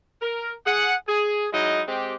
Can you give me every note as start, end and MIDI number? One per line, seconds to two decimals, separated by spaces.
0.22 0.51 70
0.66 0.94 68
0.66 0.94 78
1.08 1.47 68
1.53 1.82 54
1.53 1.82 56
1.53 1.82 63
1.53 1.82 64
1.53 1.82 75
1.88 2.14 56
1.88 2.14 60
1.88 2.14 67